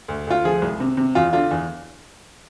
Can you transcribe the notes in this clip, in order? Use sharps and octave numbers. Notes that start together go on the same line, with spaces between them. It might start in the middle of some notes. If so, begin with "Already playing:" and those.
D2
D2 F4
F3 G#4
C2
C3
C3
E2 F4
D3 F4
E2